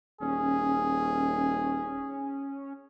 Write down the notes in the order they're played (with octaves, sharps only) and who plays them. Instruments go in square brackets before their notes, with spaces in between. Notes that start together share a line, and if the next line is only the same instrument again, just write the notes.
[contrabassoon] D#1 [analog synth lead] C#4 [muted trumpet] G#4